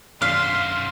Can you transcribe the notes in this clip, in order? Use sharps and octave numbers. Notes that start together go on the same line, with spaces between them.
F#2 B2 F5 C6 F6 B6